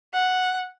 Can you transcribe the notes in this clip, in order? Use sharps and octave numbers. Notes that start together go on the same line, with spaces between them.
F#5